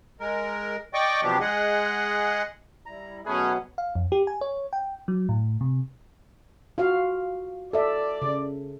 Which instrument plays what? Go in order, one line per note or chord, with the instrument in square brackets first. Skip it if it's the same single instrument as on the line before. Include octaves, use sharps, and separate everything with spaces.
[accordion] G#3 A#4
D5 D#5 G5 C#6 D6
C3 F3 F#3 B3 D4 G4
G#3 G#4 D#5 F#5
[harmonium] G3 E4 [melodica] A#5
[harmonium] B2 F#3 B3 [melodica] A3 B4 G#5 [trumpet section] C#4 G#4
[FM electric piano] F5
F2
G4
G#5
C#5
G5
F#3
A2
C3
[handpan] F4 F#4 F5
[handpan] A4 E5 [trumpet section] D5
[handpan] C#3